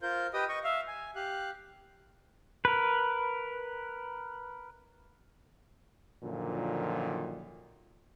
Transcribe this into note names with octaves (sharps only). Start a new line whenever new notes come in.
F4 A#4 C5 G6
G4 B4 D#5 G5 D#6
D#5 C#6
E5 F5
G#5
G4 F5 F#6
A#4 B4
F#2 A#2 D3 D#3 F3